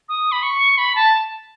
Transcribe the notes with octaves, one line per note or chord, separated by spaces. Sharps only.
D#6
B5
C#6
B5
A5